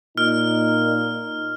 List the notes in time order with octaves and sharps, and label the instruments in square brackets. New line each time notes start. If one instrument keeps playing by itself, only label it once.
[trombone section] A#2 D#4 [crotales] F6